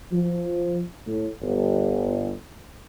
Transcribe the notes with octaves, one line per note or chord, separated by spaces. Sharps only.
F3
A2
G1